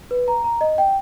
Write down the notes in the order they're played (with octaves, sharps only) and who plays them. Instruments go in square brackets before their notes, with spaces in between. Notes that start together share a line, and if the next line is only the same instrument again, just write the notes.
[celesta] B4
A#5
A#5
D#5
G5